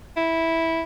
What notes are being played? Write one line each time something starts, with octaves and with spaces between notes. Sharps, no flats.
E4